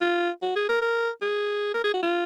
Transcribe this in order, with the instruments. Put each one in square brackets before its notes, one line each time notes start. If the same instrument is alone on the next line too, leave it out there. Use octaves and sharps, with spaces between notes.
[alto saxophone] F4
F#4
G#4
A#4
A#4
G#4
A#4
G#4
F#4
F4